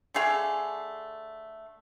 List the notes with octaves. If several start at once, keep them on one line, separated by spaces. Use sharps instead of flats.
D3 A3 G#4 F5